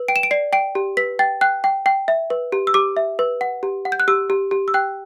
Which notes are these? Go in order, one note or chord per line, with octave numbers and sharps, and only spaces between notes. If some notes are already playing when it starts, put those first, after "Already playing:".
Already playing: B4
G5 D7
E7
D7
D5 C7
G5 D7
G4
B4 B6
G5 A6
G5 F#6
G5
G5
E5
B4
G4
E6
G4 D6
E5
B4
F#5
G4
F#5
G6
F#6
G4 E6
G4
G4
E6
G5 F#6